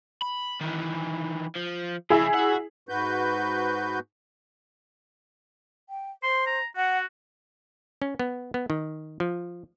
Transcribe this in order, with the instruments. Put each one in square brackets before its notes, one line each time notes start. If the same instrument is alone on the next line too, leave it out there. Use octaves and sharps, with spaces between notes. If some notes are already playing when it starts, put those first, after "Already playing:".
[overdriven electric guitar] B5
D#3 E3
F3
[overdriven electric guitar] F2 C#3 [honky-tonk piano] E4 G#4
[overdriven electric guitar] F#4 F#5
[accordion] G#2 F#4 B4 G6
[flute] G5
[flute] C5 [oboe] C6
[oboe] A#5
[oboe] F#4 [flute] F#5
[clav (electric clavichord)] C#4
B3
B3
D#3
F3